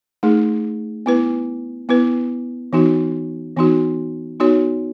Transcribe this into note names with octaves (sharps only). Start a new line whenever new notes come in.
A3 D#4 G#4
B3 E4 B4
B3 E4 B4
E3 B3 D#4 F#4
E3 B3 D#4 F#4
B3 D#4 F#4 C#5